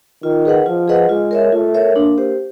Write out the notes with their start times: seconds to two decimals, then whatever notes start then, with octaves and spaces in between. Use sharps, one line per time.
0.23 D#3 F4
0.45 G#4 B4 D#5 F#5
0.66 F3 F4
0.88 G#4 B4 D#5 F#5
1.09 G#3 F4
1.31 A#4 C#5 E5
1.52 A3 F4
1.74 A#4 C#5 E5
1.96 A#3 D4
2.18 G4 C5